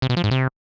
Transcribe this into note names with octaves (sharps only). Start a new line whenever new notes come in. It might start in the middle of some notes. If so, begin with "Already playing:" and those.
C3
B2
F3
G#2
C3